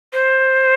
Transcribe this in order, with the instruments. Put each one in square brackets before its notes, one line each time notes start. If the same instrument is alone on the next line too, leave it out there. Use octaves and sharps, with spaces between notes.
[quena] C5